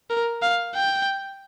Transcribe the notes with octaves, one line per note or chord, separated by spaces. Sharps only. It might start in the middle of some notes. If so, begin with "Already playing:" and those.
A#4
F5
G5